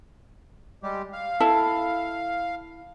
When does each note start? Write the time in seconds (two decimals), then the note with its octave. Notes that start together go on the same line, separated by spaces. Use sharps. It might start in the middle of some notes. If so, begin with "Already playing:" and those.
0.83 G3 G#3 G4
1.13 F5
1.40 E4 A4 A5